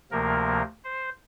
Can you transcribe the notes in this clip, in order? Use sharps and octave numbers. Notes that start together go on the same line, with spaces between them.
D2 C3 F3 A#3 A#4
C5